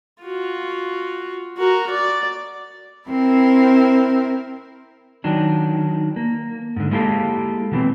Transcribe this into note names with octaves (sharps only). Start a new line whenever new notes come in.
F4 F#4
F#4 A#4
D5
C4 E4 A#4 C5
D#3 F#3 D4
A#3
G#2 D3
G#3 A#3 E4 G4 A4 F5
B2 E3 C4